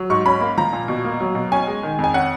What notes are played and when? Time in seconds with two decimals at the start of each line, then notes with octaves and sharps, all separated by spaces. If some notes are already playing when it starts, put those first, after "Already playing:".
Already playing: F#3
0.10 G#2 C#6
0.26 C#4 B5
0.41 A#3
0.58 F3 A#5
0.73 A#2
0.88 B2
1.05 A#3
1.20 F#3
1.35 B2
1.52 C#4 G#5
1.67 G#3
1.83 D#3
1.99 F2
2.04 G#5
2.14 C#4 F#5